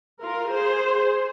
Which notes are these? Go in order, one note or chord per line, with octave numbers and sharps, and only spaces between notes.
F4 A#4
G#4 C5